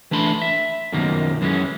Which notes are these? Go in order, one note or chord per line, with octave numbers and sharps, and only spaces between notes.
E3 A3 D4 B5 C6
E5
F#2 B2 D#3 F3 A#3
F#2 E3 G#3 C4 C#4